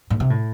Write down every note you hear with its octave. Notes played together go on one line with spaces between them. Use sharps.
A2
C3
A2